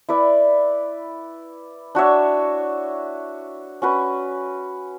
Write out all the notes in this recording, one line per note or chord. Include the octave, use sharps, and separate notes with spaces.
E4 B4 D5
D4 F#4 C#5 E5
C#4 F#4 B4